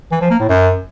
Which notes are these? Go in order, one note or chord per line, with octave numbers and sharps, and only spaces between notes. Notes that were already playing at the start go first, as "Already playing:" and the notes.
E3
F3
A#3
A2
F#2